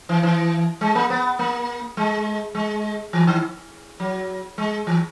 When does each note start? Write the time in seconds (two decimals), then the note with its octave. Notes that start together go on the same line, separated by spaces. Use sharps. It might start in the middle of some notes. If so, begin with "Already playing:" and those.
0.09 E3
0.23 E3
0.81 G#3
0.95 A#3
1.10 B3
1.39 A#3
1.97 G#3
2.55 G#3
3.13 E3
3.27 D#3
4.00 F#3
4.58 G#3
4.87 E3